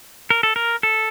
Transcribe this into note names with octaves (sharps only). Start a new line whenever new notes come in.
A#4
A4
A#4
A4